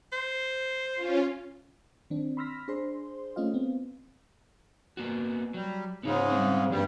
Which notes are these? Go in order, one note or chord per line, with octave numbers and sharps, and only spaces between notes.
C5
C#4 F4
D#3 C4 D4
B5 C6 E6 F6 A#6 B6
D4 G#4 C5 C6
A3 C#4 F4 D#5 F5
B3 C4
A#3 B3 F#4
F#3 G3
G#2 C#3 B3 D#4 F4
G3 G#3 C4
G2 E3 G3 A#3 C#5